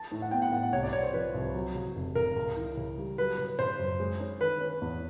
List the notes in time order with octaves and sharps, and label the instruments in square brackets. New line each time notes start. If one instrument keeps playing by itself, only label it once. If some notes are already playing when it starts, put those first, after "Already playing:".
Already playing: [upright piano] A5
[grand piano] A2
[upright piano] F#5
[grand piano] B3 [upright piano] G5
[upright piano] F#5
[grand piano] A2 [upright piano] F#5
[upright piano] F#5
[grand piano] C2 [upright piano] C#5
[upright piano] D5
[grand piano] C2 [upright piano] C#5
[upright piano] C5
[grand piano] F3 [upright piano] B4
[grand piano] C2
F#3
C#3
F1
[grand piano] C#3 [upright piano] A#4
[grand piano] C#2
E3
C#3
G3
[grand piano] F#3 [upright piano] B4
[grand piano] C#3
[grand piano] C#3 [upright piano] C5
[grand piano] F#2
G#3
C#4
[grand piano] D#3 [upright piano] B4
[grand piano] C#4
E2